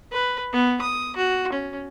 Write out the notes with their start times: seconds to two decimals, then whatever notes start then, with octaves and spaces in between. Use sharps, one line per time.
0.12 B4
0.53 B3
0.81 D#6
1.16 F#4
1.53 C#4